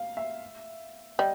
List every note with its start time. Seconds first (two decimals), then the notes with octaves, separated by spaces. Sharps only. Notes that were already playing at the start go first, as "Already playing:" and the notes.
Already playing: F5
0.17 E5
1.19 G3 D#5